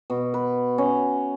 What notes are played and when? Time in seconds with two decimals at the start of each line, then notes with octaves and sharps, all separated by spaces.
0.10 B2
0.34 B4
0.78 C#4